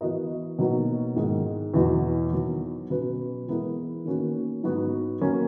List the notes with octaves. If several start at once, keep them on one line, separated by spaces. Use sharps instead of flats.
E3 B3 F#4 A#4 D#5
B2 F#3 A#3 D#4
G#2 D#3 G#3
E2 B2 F#3
D#3 F#3 B3
B2 F#3 C#4 F#4 B4
E3 G#3 B3 E4 A#4
D#3 A#3 C#4 F#4
G#2 F#3 B3 F#4
F#3 A#3 C#4